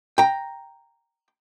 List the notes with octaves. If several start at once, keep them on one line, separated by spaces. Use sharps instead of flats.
G5 A#5